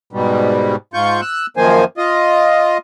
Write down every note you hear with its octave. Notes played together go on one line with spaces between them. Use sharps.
G#2 B2 G3
G#2 F4 C#6 G6
E6 F#6
F#2 D#3 F3 A#3 C5 G#5
F4 D#5